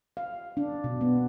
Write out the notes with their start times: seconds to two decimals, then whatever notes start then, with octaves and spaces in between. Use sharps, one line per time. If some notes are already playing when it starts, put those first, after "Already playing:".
0.17 F5
0.57 D4
0.84 B2
1.01 B3